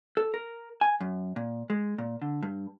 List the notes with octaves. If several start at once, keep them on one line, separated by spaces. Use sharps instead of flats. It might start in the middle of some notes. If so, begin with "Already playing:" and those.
A4
A#4
G#5
F#2
A#2
G#3
A#2
D3
G2